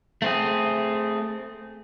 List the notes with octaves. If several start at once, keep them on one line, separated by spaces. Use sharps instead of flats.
A3 C4 G#4